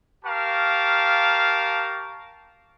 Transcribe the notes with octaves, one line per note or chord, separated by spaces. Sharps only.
G4 A#4 F5 A5 C#6